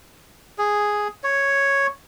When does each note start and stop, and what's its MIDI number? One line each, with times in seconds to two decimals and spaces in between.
0.58 1.08 68
1.24 1.87 73